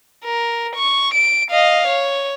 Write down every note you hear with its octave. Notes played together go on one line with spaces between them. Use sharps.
A#4
C#6
D7
D#5 F5
C#5